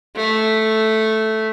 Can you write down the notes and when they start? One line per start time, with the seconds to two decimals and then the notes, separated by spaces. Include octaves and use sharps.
0.16 A3